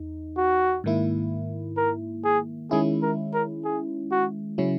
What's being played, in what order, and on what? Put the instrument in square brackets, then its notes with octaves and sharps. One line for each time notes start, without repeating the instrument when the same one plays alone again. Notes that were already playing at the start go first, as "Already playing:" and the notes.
Already playing: [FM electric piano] E2 D#4
[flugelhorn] F#4
[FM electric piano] G#2 D#3 A#3 E4
[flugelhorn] A#4
G#4
[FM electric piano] D#3 G#3 C#4 E4 [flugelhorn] G#4
[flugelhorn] A#4
A#4
G#4
F#4
[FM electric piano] C#3 F#3 C#4 E4